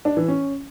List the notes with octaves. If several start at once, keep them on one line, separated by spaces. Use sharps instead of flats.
D4
E3
C#4